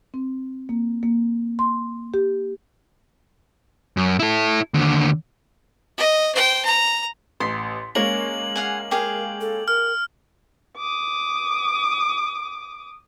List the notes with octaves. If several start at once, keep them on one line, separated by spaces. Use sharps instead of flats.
C4
A#3
A#3
C6
G4
F#2
E4 A4
D#2 D3
D#5
C5 G5
A#5
A1 C6 B6
G#3 A#3 C#4 A#4 C#5 F#7
F5 F#5 G#5
G4 G#4 A#4 F5
A4
A#4 F6
D6 D#6